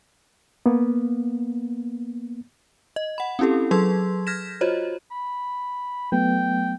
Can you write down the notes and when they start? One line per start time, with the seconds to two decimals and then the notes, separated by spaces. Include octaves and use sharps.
0.66 A#3 B3
2.96 D#5
3.18 F#5 B5
3.39 C4 C#4 E4 G4 A4
3.71 F#3 G#4 A4 C6 E6 G#6
4.27 F6 G6 G#6 A#6 B6 E7
4.61 F4 F#4 C5 C#5 D#5
5.12 B5
6.12 F#3 A3 B3 G5